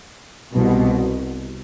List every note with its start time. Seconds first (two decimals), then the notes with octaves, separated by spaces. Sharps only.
0.54 C2 B2